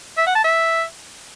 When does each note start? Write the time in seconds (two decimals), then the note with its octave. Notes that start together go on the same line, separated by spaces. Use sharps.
0.18 E5
0.27 F#5
0.35 A5
0.44 E5